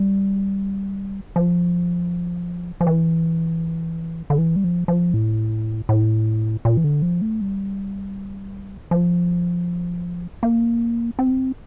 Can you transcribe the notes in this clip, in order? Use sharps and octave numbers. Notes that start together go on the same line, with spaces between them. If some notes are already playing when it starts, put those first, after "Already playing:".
Already playing: G3
F3
F3
E3
D3
E3
G3
F3
F3
A2
A2
A#2
E3
D3
F3
A3
G3
F3
A#3
C4